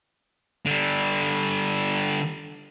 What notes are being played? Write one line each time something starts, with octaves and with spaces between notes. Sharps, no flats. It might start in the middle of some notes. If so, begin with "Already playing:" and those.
D3 G3